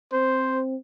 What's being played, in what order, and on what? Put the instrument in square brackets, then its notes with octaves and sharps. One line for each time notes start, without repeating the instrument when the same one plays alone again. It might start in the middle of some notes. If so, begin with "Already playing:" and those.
[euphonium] C4 [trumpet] C5